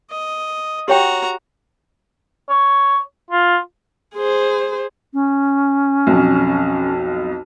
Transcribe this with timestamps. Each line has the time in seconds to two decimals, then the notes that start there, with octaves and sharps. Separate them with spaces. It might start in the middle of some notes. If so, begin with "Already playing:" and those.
0.11 D#5
0.88 F#4 G4 C#5 G5 A#5
2.49 C#5
3.30 F4
4.15 G#4 C5
5.13 C#4
6.07 B1 F2